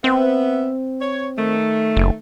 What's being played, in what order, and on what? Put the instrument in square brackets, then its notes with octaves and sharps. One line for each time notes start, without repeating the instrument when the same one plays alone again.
[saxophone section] B3 E5 [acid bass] C4
[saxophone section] C#5
D#3 A3
[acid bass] F#1